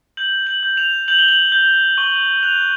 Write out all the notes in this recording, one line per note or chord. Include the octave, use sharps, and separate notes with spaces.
G6 F#7
F#7
G6
F7
G6 F#7
G7
F#7
G6
C#6 G7
F#6 F7